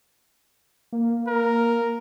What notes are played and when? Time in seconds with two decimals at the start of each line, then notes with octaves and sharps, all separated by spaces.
0.93 A#3
1.27 A#4